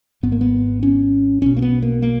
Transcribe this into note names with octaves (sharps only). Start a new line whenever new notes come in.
G#1 G#2 B3
A#3
B3
C#4
B1 B2 C#4
A#3
B3
A#3
A#3